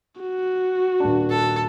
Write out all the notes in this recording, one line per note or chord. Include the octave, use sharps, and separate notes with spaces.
F#4
D#1 D4
A4